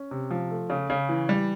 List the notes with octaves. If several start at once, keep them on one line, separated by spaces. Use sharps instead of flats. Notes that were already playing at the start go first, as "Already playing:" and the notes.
Already playing: C#4
C3
F3
A3
C#3
C#3
E3
G3